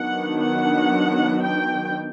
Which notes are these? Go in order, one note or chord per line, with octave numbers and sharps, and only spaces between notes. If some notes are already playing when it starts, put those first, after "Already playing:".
Already playing: D#3 F#3 B3 D4 F#5
F#5
G5